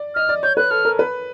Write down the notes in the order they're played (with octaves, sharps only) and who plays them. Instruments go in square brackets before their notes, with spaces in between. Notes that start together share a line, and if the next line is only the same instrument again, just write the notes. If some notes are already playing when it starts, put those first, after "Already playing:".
Already playing: [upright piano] D5
[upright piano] D#5 [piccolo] F6
[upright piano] D5
[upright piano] C#5 [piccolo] G6
[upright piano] B4 [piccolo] F#6
[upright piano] A4 [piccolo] F6
[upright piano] A#4
B4